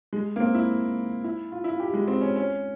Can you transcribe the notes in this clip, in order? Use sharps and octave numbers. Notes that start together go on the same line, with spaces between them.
G#3
A#3
C4
E4
E4
F4
E4
F4
G4
G#3
C4
C#4
C#4